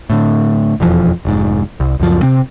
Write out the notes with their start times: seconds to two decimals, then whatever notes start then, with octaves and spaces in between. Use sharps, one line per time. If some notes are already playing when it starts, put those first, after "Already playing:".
0.10 A2 D3
0.80 E1 F2 E3 F3
1.25 F1 G#2
1.80 C2
2.00 C#2 F#2 F3
2.23 C3 C4